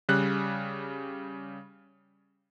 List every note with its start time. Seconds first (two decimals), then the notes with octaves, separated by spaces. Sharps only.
0.09 C#3 G3 F#6